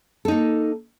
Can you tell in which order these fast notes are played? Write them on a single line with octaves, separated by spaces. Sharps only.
A4 D#4 A#3